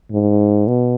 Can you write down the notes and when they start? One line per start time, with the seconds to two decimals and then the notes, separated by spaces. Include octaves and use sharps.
0.12 G#2
0.67 B2